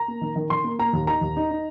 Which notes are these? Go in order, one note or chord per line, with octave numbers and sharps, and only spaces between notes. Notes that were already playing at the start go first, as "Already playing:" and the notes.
Already playing: A#5
A#3
D#3
D#3
D#3 C6
A#3
A#3 A#5
D#2
D#4 A#5
D#2
D#4
D#4